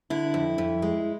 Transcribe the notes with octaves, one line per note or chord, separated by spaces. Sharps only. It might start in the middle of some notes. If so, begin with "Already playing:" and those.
D3 E4
F2
F2
G#3